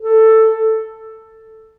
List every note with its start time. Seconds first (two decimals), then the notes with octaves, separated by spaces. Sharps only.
0.01 A4